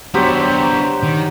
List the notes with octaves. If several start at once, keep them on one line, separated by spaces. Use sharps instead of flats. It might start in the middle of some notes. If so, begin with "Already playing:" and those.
F#3 B3 D4 G4 C5
D#3